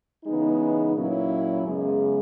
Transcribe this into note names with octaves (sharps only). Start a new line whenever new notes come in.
C#3 E3 G#3 B3 D#4
A#2 F#3 A#3 C#4 E4
F#2 C#3 G#3 B3